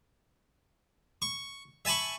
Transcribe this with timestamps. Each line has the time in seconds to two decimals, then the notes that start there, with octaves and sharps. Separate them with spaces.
1.22 C#6
1.85 E5 G#5 A5 B5 C#6